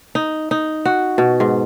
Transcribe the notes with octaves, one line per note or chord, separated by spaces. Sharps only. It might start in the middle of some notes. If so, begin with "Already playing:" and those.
D#4
D#4
F#4
B2
G#2